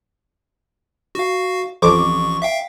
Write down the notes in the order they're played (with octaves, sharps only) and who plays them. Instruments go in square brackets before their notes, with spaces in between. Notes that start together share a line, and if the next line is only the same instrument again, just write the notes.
[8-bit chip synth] F#4 F5
[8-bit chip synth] A1 C#6 [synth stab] F2 D6
[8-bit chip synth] E5 F5 G5